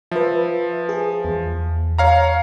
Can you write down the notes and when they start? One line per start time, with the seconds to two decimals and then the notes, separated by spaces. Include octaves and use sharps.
0.11 F3 B4 E5
0.89 G#4
1.25 E2
1.99 C#5 F5 A#5